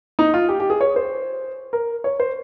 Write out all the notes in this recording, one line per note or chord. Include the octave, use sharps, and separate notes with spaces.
D#4
F4
G4
G4
G#4
C#5
C5
A#4
C#5
C5